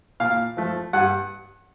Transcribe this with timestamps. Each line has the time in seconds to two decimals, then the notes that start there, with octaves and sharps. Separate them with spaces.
0.20 A#2 F5
0.57 F3 A3
0.93 G2 F#5